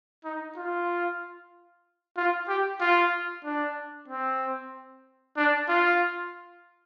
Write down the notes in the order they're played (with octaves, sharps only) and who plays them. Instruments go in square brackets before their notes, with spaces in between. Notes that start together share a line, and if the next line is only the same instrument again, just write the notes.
[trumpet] D#4
F4
F4
G4
F4
D4
C4
D4
F4